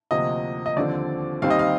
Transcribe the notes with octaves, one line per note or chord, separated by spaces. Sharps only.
D2 C3 F3 A#3 D#5
D#5
D#2 D3 F3 C4 D5
D#2 D#3 G3 C4 F5
D#5
F5